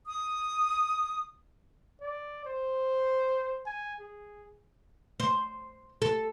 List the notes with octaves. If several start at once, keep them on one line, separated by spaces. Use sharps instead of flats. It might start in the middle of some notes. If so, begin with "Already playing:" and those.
D#6
D5
C5
G#5
G#4
C5
A4